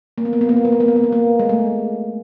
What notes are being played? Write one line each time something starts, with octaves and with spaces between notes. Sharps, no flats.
A#3
B3
A#3
B3
A#3
B3
A#3
B3
A#3
B3
A#3
B3
A#3
G#3
A3